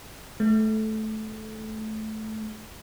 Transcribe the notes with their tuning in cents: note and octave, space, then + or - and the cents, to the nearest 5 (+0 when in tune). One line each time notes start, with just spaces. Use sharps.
A3 -15